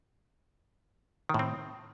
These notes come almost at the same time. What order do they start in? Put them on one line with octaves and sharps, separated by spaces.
D#3 A2 C4